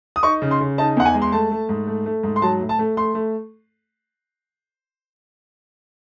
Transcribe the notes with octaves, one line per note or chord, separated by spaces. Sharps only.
D#6
D#4 C#6
C#3
C6
C#3
D#4 A5
E2 F#5
G#5
G#3
C6
A3 A5
A3
G#2
A3
A3
G#2
C6
F#3 A5
A2
A5
A3
A3 C6
A3